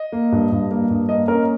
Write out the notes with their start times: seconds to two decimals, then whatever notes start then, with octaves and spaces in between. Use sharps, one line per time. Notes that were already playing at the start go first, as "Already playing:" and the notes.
Already playing: D#5
0.12 A#3
0.32 G2
0.52 G2
0.71 A#3
0.90 G2
1.09 A#3 D#5
1.28 C#4 A#4